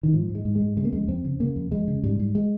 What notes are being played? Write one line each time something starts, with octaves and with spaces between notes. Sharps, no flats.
D#3
G#2 F3
G#2
G#3
G#2
G#3
G#2
C#3 G#3
A#3
F2 G#3
F2 C4
C#3
C#3 A#3
F2
F2 G#3
C#3
G#2 G3
G#2
G#3